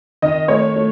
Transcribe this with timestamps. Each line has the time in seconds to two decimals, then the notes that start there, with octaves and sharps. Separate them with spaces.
0.22 D#3 D#5
0.48 A3 C#5
0.75 A3